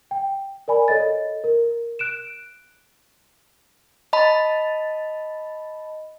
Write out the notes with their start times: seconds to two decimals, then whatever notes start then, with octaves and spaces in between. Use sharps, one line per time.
0.11 G5
0.68 A#4 D5 G#5 B5
0.88 A4 C#5 D#5 A6
1.44 A#4
1.99 F#6 D7 E7
4.13 D#5 A5 B5